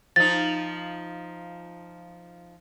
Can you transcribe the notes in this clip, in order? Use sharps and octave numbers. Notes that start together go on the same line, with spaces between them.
F3 D#4 A6